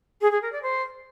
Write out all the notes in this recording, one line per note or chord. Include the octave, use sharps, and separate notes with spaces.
G#4
G#4
A#4
D5
C5